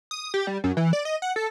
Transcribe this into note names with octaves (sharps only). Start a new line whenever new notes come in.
D#6
G4
G3
F#2
E3
D5
D#5
F#5
A4